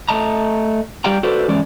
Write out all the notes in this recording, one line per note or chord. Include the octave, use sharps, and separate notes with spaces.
A3 D#5 A5 A#5
G3 G4 D5 F5 G5 A#5
F#4 A4 B4 C5 D5
E3 G#3 C#4 D5